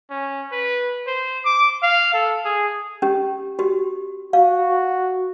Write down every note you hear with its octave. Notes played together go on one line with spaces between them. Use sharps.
C#4
B4
C5
D6
F5
A4
G#4
C#4 G4
F#4 G4
F#4 F5